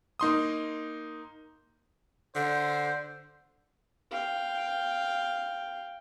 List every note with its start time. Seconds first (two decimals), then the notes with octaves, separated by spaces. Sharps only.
0.20 A#3 D#4 C6 D#6
2.35 D3 C5
4.11 F5 G5